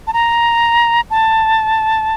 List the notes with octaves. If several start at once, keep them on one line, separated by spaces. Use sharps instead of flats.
A5
A#5
A5